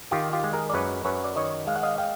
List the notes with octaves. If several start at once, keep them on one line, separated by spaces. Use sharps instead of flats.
D#3 F4 G4
F4 G4
G#3
G#4 A#4
D5
F#2 B4 C#5
F#2 B4 C#5
D5
D#3 C#5 D#5
G#3 F5
F#5
D#5 F5
F5 G5